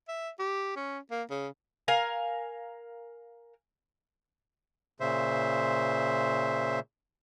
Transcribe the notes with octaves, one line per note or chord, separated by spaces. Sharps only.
E5
G4
C#4
A#3
C#3
A#4 F5 G#5
A#2 C#3 C5 E5